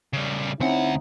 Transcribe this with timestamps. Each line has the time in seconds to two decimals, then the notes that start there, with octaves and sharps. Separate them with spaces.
0.13 C#3 G3
0.60 D2 C4 C#4 D#4 E4 F#5